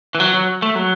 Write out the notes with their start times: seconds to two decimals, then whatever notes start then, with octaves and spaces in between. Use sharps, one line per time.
0.15 E3
0.20 F#3
0.34 F#3
0.62 A3
0.75 F#3